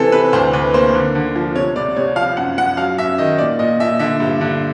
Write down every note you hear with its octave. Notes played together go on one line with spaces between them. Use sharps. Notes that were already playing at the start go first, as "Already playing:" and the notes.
Already playing: C3 E3 C4 A4
C3 B4
D2 C5
D2 B4
A#3 C5
D3
D3
F3
C3 C#5
C2 D5
C2 C#5
F3 F5
F#2 F#5
F#2 F#5
F#3 F5
F#2 E5
D#3 D#5
A#2 D5
A#2 D#5
A#2 E5
D3 E5
G2
D3